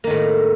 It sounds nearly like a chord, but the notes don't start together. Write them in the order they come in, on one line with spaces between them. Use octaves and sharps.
A#3 D#3 A2